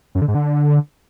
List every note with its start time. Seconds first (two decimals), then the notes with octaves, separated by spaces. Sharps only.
0.15 F#2
0.21 D3
0.28 G#2
0.35 D3